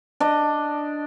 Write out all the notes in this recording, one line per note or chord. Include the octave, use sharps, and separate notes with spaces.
D4 D#5